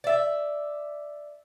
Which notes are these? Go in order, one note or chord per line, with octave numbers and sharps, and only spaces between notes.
D5 E5